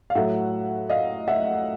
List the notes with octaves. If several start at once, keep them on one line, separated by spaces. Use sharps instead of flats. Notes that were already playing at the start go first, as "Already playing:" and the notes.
F5
A2 F#3 A3 E5 F#5
D#5 F5
E5 F#5